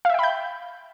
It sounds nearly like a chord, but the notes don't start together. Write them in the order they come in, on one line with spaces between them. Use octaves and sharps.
F5 E5 G5 B5 G6